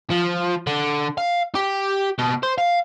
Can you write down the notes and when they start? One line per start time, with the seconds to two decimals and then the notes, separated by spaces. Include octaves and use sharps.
0.11 F3
0.67 D3
1.18 F5
1.55 G4
2.19 B2
2.43 C5
2.58 F5